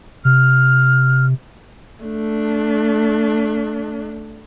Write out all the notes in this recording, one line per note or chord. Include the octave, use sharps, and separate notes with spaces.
C3 F6
A3 D4